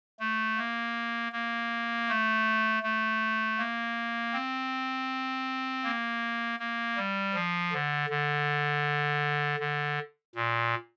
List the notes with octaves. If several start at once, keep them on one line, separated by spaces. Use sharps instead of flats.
A3
A#3
A#3
A3
A3
A#3
C4
A#3
A#3
G3
F3
D3
D3
D3
A#2